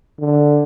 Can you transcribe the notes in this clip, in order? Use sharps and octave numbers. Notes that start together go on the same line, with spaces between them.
D3